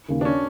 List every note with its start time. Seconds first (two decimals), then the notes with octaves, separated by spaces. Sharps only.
0.09 D#2 C#3
0.21 D4
0.25 C#4